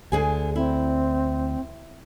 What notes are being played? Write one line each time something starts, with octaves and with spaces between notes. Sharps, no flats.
D2 D3 G#4 G#5
C4 E4